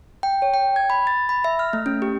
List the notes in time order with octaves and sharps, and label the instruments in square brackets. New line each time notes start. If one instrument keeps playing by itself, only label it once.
[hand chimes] G5
C#5
G5
G#6
B5
A6
B5
E5
F6
A3
C#4
G4